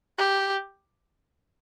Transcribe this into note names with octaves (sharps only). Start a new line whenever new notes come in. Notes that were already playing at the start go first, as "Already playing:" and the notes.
G4